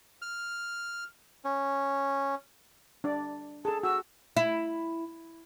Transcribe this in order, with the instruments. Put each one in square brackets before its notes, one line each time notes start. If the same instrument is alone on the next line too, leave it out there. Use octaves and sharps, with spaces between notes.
[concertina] F6
C#4
[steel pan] D4 D5
[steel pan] G#4 A4 [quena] A5
[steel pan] F#4 [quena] E6
[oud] E4